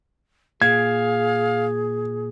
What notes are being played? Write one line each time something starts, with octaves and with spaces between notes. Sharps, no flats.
A#2 G#4 F5 G#6